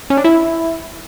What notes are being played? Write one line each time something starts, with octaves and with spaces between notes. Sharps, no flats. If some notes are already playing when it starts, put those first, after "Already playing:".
C#4
D4
E4